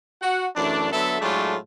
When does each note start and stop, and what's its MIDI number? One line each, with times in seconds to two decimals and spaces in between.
0.22 0.47 66
0.22 0.47 78
0.56 0.91 42
0.56 0.91 52
0.56 0.91 57
0.56 0.91 62
0.92 1.20 50
0.92 1.20 54
0.92 1.20 59
0.92 1.20 69
0.92 1.20 76
1.21 1.56 45
1.21 1.56 54
1.21 1.56 56
1.21 1.56 57
1.21 1.56 62
1.21 1.56 65